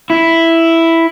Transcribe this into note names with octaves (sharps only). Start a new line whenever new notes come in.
E4